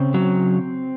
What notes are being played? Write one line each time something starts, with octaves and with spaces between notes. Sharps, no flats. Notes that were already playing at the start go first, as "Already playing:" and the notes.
Already playing: C#3 C4
F#3